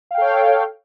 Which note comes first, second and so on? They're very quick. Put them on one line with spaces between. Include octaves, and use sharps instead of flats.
F5 G5 A4 C#5